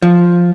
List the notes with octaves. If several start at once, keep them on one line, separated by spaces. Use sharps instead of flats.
F3